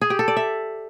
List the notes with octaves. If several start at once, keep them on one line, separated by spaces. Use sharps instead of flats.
G#4
G4
A4
D5
E5